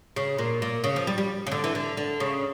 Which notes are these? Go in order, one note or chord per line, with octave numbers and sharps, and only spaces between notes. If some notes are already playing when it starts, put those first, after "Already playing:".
C#3
A#2
A#2
C#3
F3
G3
G3
C#3
D3
E3
D3
D3
C#3